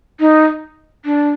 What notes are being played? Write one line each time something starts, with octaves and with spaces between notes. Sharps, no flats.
D#4
D4